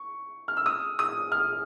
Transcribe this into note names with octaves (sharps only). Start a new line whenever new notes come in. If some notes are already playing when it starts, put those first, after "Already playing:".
Already playing: C#6
F6
E6
D#6
D#6
F6